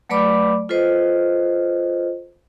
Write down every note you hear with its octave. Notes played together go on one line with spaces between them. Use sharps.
F#3 A3 B4 D5 B5 D6
F4 A4 B4 C5 D#5